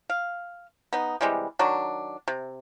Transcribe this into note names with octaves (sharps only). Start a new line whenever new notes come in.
F5
B3 D#4
C3 E3 G3 G#3
D#3 F#3 D4
C3